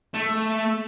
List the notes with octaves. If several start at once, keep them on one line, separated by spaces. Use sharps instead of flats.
A3